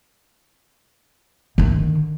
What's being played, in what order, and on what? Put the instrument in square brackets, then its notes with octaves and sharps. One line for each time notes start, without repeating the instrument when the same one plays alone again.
[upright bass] D3 D#3